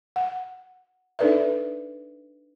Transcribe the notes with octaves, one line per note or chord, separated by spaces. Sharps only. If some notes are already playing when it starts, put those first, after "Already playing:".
F#5
D4 D#4 A4 B4 D5 E5